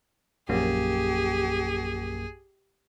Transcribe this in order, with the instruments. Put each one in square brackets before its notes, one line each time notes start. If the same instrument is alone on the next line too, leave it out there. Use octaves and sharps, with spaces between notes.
[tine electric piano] A#1 F#2 A#3 [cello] G4 [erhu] G#4